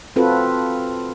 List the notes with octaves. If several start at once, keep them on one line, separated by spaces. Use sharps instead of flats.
C4 F4 F#4 A4 B4